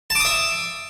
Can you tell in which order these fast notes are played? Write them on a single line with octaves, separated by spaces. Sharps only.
A5 D6 D#6 E5